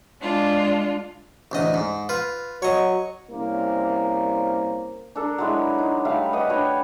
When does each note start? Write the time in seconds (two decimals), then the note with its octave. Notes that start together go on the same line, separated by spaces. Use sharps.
0.22 G#3 D4 F4
1.52 A1 D2 D#5
1.74 G#2
2.09 F4 B4
2.62 F#3 C#5 D#5
3.30 C2 A#3 C#4 A#4 C5
5.16 D4 A4 A#4
5.38 F#3 G#3 E4
5.78 D#4
6.05 G3 A3 E5 F5
6.33 G4 B4 D#5 F#5
6.49 D4 F#4 G4 C#5